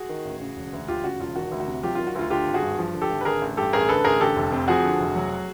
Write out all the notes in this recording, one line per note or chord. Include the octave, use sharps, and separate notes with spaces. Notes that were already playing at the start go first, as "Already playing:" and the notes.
Already playing: F#4 G#4
D#3
A1
C#3
E1
D2
E1 F4 G4
C#3 F#4
E1 F4
D#3 F#4
D2
F#4
C3
F#3 F4 G4
D#3 F4
F#4
D2 F4
D3 F4 G4
G#1
F#4 G#4
G2
F3
D3
G4 A4
G#1
B4
D3 G#4 A#4
A1
G2 G4 A4
A1 G#4 A#4
D3 A4 B4
A1 G#4 A#4
D3 G4 A4
F1
F2
F3 F#4 G#4
D3
F1
F#3